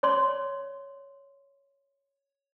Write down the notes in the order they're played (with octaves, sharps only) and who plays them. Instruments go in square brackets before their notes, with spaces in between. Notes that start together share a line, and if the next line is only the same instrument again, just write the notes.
[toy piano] C#5 D5 C6